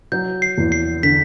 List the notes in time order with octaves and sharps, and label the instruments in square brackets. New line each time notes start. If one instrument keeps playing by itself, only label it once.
[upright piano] F#3 [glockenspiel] G6
[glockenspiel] C7
[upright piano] E2
[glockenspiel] C7
[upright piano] D3 [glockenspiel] B6